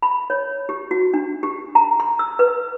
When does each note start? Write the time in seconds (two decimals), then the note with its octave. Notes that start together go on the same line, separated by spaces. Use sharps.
0.03 B5
0.30 C#5
0.69 G4
0.91 F#4
1.14 D4
1.43 G4
1.75 A#5
2.00 C6
2.19 E6
2.39 B4